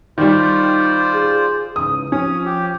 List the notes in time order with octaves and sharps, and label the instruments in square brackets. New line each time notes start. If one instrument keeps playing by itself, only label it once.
[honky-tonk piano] D#3 G3 [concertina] F4 C5 D5
[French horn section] G#4
[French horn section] G#2 C#3 E3 [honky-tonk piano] D#6
[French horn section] F3 [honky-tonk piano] C#4 [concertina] D#6
[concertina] G4